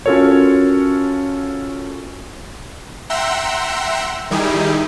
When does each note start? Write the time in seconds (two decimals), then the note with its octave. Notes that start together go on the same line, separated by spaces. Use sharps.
0.06 C#4 F4 F#4 A4 A#4 C#5
3.10 E5 F#5 G5 A#5 C6 E6
4.31 D#3 G3 D#4 E4 G4 G#4